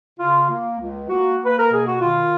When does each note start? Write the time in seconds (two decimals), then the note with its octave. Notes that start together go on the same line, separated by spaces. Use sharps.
0.19 C#3 F4
0.50 A#3
0.80 C#2
1.10 A#3 F#4
1.40 A#3
1.45 B4
1.59 A#4
1.70 B2 G#4
1.86 F#4
2.00 D#3 F4